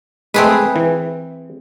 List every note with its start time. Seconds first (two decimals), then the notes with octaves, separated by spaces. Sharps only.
0.34 G#3 A3 C4 G#4 B4
0.76 E3